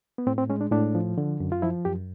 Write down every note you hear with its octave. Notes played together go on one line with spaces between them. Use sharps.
B3
A2 C4
C4
G#3 C#4
D4
A2 D4
F3
D3
F#2
F4
F3 E4
F#2 G4